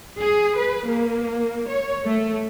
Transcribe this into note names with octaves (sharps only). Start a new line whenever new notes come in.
G#4
B4
A#3
C#5
A3